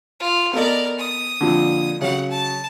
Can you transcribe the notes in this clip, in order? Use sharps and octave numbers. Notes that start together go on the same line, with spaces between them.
F4
B3 A4 A#4 D5 D#5
D#6
F2 A#2 D3
C#3 F#3 F#5
A5